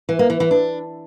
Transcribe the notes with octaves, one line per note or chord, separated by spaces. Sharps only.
E3
A#3
E3
E3
D4